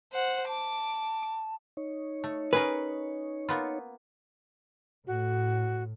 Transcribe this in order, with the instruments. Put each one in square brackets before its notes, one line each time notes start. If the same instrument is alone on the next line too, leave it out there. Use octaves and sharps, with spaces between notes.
[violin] C5 F#5
[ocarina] A5 [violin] D6
[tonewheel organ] D#4 C#5
[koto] A3
[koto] C#4 G#4 A#4 [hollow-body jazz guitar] B4
[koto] A#3 B3 F4
[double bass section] A2 [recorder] F#4